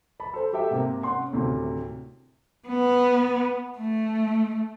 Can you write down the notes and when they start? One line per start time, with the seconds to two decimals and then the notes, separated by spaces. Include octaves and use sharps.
0.20 A5 B5
0.34 A4 C5
0.53 F#4 G4 A4 E5 G5
0.71 G#2 C3 A#3
1.03 C#4 F#5 C6
1.33 D2 A2 C3 D#3
2.68 B3
3.79 A3